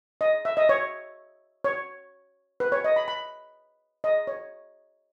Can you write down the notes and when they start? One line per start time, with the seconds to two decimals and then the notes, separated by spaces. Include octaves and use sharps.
0.21 D#5
0.45 E5
0.57 D#5
0.69 C#5
1.64 C#5
2.60 B4
2.72 C#5
2.84 D#5
2.96 B5
3.08 B5
4.04 D#5
4.27 C#5